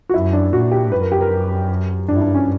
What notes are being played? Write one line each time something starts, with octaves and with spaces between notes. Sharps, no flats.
F#4
F#2 E4
D4
A#2 F#4
G4
F#2 B4
A#4
G4
A#4
G2 D4
E4
D4
C#4